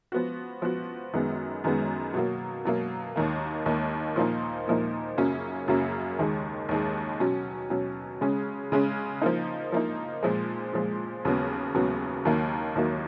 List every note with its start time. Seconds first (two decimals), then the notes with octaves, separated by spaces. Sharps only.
0.12 F3 B3 F#4
0.62 F3 B3 F#4
1.14 F#2 D#3 G#3 B3
1.64 F#2 D#3 G#3 B3
2.14 B2 F#3 A#3
2.65 B2 F#3 A#3
3.16 D#2 D#3 A#3
3.66 D#2 D#3 A#3
4.16 A#2 F3 A#3 D#4
4.68 A#2 F3 A#3 D#4
5.18 F#2 C#3 F#3 A#3 C#4
5.68 F#2 C#3 F#3 A#3 C#4
6.19 D#2 D#3 G#3
6.69 D#2 D#3 G#3
7.20 B2 F#3 C#4
7.70 B2 F#3 C#4
8.21 C#3 G#3 C#4
8.72 C#3 G#3 C#4
9.21 F3 A#3 D#4
9.72 F3 A#3 D#4
10.23 A#2 F3 G#3
10.73 A#2 F3 G#3
11.25 D#2 C#3 F#3 B3
11.74 D#2 C#3 F#3 B3
12.25 D#2 D#3 F#3 A#3
12.76 D#2 D#3 F#3 A#3